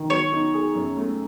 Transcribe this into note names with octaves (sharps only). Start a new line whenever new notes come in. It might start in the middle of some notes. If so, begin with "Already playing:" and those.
Already playing: D#3
F#3 C#5
D#4
G#4
F#2
A3